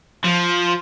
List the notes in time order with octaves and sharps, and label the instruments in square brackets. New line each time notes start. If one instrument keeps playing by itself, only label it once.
[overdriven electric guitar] F3